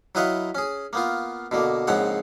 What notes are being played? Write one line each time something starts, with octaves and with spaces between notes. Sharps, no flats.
F#3 E4 B4 D#5 F5 C#6
C#4 G#4
A#3 B3 F4
B2 D3 A#3
A#1 G#2 C#3 C4 C#5 F#5